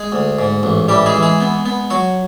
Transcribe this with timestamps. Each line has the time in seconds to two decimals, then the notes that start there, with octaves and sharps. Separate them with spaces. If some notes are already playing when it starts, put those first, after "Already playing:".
Already playing: G#3 G#4
0.12 D2
0.39 G#2
0.63 A1
0.88 E3 G3 G4
1.06 G#3 G#4
1.14 E3
1.22 G#3 G#4
1.41 B3
1.66 B3
1.90 F#3 F#4